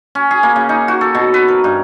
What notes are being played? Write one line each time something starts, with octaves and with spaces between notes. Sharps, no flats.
C#4
G#4
A#3
C#3
D#4
F#4
A4
B2
B4
A#4
G2